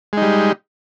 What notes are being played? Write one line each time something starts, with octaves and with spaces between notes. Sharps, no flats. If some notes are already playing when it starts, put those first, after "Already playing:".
G3 G#3 D#4